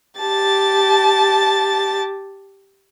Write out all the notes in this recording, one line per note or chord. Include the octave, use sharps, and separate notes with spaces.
G4 A5 A6